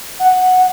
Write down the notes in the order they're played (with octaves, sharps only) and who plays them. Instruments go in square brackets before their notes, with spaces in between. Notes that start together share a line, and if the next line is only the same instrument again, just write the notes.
[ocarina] F#5